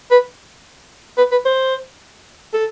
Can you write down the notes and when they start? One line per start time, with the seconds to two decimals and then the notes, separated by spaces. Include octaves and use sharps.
0.11 B4
1.18 B4
1.31 B4
1.45 C5
2.53 A4